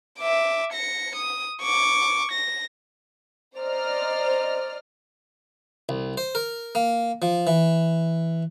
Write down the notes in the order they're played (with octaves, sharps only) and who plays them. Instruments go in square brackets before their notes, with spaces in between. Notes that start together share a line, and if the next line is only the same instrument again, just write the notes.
[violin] E5 D6
A#6 C#7
D#6
C#6 D6
A#6
[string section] C5 D5 D#5 A#5 F6
[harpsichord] C2
C5
A#4
A#3
F3
E3